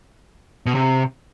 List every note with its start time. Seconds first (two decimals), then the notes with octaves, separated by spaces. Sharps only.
0.66 B2
0.75 C3